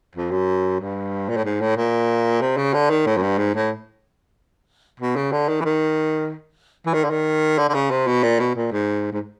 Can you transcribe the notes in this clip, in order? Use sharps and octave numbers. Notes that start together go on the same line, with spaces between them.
F2
F#2
G2
A#2
A2
G#2
A2
A#2
C3
C#3
D3
D#3
A2
F#2
G2
G#2
A2
B2
C#3
D3
D#3
E3
D#3
E3
D#3
D3
D#3
D3
D3
C#3
C3
B2
A#2
B2
A#2
G#2
G#2